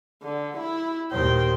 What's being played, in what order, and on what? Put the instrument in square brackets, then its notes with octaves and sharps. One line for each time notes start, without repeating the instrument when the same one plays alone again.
[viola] D3
E4
[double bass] D#2 A#2 [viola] C5 G5